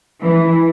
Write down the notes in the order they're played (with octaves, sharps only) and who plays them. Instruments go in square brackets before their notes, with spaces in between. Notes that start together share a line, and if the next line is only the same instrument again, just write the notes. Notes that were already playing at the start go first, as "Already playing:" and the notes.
[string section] E3